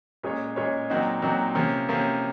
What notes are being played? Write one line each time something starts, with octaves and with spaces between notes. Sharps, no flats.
A#2 G#3 C#4 G#4 C#5
A#2 G#3 C#4 G#4 C#5
A#2 F#3 C4 D#4 F#4
A#2 F#3 C4 D#4 F#4
C3 F3 A#3 C#4
C3 F3 A#3 C#4